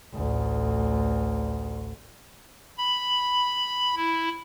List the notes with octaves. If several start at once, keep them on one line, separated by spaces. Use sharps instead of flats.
A1 D2
B5
E4